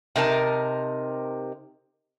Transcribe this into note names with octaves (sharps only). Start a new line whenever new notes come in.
C3 D#4 A#4 A5